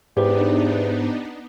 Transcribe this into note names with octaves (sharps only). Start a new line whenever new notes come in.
E2 G#2 B3 D4 D#4 G4 B4 C5